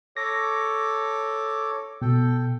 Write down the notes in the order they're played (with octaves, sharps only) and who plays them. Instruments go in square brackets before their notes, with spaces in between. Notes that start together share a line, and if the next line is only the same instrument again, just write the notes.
[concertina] A4 C#5 D6 [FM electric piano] A#6
[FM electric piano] B2 [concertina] A4 G5